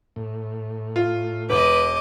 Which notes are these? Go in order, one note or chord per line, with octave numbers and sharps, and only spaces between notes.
A2
F4
E1 B4 D#5 D6